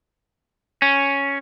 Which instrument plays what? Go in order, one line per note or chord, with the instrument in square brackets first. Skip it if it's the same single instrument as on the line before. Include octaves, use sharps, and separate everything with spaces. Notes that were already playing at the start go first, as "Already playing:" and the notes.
[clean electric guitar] C#4